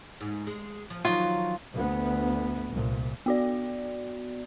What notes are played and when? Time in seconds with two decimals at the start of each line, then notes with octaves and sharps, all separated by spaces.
0.21 G#2
0.47 G#3
0.90 F3
1.05 D#3 F3 F#3 F4
1.74 D2 B3
2.70 C2 A#2
3.26 B3 F#4 D5